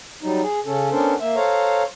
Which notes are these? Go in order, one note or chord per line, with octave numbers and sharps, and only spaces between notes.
F#3 G3 D#4
G#4
C#3 C#4 A4
B3 C#4 D4 A4 A#4 C5
A#3 E5
A4 C5 C#5 F5 A#5